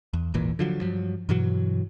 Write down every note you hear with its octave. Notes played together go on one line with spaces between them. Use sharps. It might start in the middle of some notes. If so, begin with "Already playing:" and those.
E2
D#1 G#1 A#2 E3
D3 F3 F#3
G2 F3 F#3
G2 B2 E3 F#3